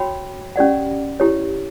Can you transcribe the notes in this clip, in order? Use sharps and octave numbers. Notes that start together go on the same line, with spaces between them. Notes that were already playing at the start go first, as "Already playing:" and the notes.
Already playing: F#4 C#5 G5 B5
C#4 G4 D5 F#5
E4 G4 C#5